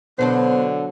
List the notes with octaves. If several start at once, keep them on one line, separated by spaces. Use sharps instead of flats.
B2 D3 F#3 B3 D4 C5